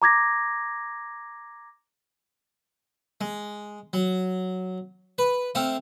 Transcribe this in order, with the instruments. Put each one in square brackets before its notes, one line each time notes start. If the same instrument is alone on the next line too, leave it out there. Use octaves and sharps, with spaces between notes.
[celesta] A#5 D6 G#6 A#6
[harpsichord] G#3
F#3
B4
A3 C4 F5